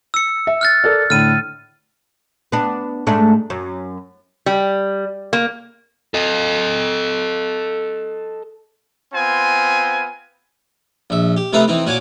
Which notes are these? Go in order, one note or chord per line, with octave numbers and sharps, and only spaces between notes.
E6 C#7
E5
F6 F#6 A6
A4 A#4 D5
A2 D3 F6 D#7
B3 D4
G#2 A3 D4
F#2
G3
A#3
A4 D#5
B3 C4 F4 G#5
A#1 E5
G4
C3 A3 D#4 B4 E5 F5
E3 C4 D#4
A#2 F#4 C#5 G#5 D6